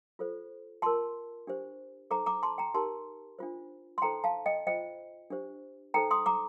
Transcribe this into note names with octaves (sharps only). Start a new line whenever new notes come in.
F4 A4 C5
F4 A#4 A5 C6
D4 G4 C5
D#4 A4 C5 A#5 D6
A#5 D6
A5 C6
G5 A#5
D#4 G4 A#4 A5 C6
D4 F4 C5
C6
D#4 A4 C5 G5 A#5
F5 A5
D#5 G5
F4 C5 D#5 G5
D4 G4 C5
D#4 A4 C5 G5 A#5
C6 D#6
A#5 D6